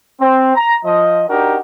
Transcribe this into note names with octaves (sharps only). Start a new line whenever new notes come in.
C4
A#5
F3 D#5
D4 D#4 F#4 G4 A#4